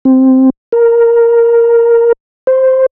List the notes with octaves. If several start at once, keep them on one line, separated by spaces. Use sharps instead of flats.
C4
A#4
C5